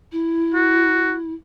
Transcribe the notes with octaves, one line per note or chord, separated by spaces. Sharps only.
E4
F#4